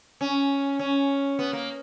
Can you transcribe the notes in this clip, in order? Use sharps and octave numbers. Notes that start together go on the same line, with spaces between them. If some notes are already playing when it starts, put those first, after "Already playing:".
C#4
C#4
B3
A#3